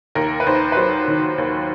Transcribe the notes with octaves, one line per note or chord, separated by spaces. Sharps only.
D#2 A#4
B4
D#2 C5
B4
F#3 C5
D#3
D#2